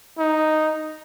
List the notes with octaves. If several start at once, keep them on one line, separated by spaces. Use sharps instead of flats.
D#4